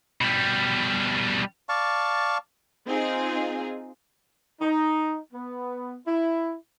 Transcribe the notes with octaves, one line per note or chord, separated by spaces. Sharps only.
B2 G3
D5 F5 A5 C#6
C4 D#4 F4 G#4
D#4
B3
E4